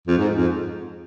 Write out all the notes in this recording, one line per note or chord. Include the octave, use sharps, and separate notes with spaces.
F2
G#2
F2